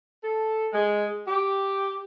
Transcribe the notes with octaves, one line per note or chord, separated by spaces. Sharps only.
A4
G#3
G4